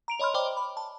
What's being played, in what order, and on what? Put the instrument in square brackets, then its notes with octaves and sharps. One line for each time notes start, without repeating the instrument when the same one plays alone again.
[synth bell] A#5 D7 F7
C#5 D#5 B5 C6 F6
C5 D5 D#5 G5 B5 D6
B5
A5